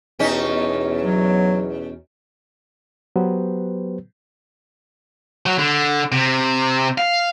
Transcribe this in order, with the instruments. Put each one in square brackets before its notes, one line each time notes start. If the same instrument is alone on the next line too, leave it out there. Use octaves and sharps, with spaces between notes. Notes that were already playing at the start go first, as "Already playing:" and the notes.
[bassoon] E2 [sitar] B2 C#4 D#4
[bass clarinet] F#3
[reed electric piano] F#3 B3 G4 B4 C5
[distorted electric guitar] F#3
D3
C3
F5